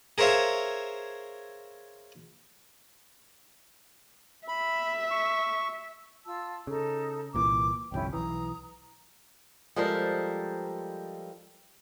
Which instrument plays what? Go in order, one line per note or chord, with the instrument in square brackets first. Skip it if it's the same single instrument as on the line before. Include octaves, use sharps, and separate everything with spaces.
[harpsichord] G#4 A#4 C5 C#5 E5 F5
[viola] E5 [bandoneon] B5
[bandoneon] C#6
[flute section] F4 A5 E6
[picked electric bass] C#3 [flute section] D#4 A4
[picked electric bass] C2 A#2 E3 [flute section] D6
[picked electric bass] G1 C2 F2 [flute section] C#4 E4 G5
[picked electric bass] B1 E3 [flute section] A#5 D#6
[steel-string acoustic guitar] F3 G3 G#3 A4 A#4 C5